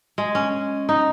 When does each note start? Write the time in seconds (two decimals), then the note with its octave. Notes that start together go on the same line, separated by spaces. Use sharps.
0.18 G#3
0.35 C#4
0.89 D#4